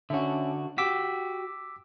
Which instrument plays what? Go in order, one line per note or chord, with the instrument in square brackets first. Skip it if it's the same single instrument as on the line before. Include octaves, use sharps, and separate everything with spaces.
[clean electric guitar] D3 F#4 [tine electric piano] C#4 E5
[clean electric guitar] F#4 G4 [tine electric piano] D6 E6 B6